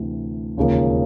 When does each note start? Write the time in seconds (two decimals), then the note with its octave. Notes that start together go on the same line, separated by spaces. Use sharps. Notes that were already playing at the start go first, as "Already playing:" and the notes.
Already playing: D2 C3 E3
0.57 E1 D#2 C#3 F3 A#3